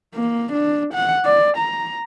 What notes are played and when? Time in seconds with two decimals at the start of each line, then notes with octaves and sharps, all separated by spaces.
0.15 A#3
0.52 D4
0.94 F#5
1.25 D5
1.57 A#5